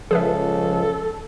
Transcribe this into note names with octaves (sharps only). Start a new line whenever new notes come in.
C#2 F3 G#4 A4 B4 E5